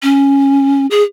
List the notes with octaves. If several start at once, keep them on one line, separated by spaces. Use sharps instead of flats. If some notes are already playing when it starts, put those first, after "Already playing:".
C#4
G#4